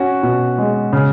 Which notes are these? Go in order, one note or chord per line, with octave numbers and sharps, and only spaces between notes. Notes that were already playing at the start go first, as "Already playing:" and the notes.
Already playing: C#4 F#4
B2
G#3
C#3